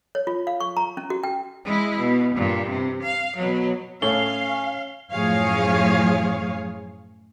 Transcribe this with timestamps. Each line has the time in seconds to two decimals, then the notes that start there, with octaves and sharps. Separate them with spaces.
0.15 C#5
0.27 F4
0.47 F5
0.60 C#6
0.77 A#5
0.97 C#4
1.10 F#4
1.23 G5
1.65 G#3 E4
1.99 B2
2.35 G2 A#2
2.69 C3
3.03 F5
3.37 B2 F#3
4.02 A2 C#4 A4 C#5 F5 G7
5.12 F#2 A2 F3 G#4 C#5 F5